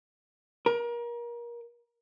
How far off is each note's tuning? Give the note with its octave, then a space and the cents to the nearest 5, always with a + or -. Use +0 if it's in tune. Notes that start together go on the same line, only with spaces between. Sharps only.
A#4 +30